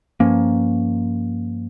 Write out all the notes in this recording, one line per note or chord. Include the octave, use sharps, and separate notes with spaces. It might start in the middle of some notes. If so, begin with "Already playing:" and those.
G2 F3 A#3 C#4